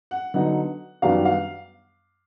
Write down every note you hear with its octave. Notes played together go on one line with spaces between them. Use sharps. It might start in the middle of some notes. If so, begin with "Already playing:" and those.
F#5
D3 F#3 B3 D#4 F#5
F#2 D#3 G3 B3 D4 F5
F5